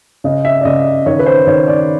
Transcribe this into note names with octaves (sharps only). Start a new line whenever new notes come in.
C#3 D#5
E5
D5
C#3 D#5
D#3 C#5
B4
C5
D#3 C#5
D5